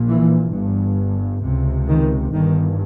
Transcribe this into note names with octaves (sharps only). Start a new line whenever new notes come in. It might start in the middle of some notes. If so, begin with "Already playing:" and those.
Already playing: A#1 A#2
E3
G1 G2
C#2 C3
D#3
G1 G2 D#3